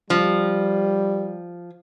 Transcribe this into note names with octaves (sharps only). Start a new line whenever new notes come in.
F3 G3